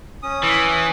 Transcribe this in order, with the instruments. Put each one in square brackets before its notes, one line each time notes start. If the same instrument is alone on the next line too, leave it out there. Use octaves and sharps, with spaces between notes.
[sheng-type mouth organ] C#4 D#6
[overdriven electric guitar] E3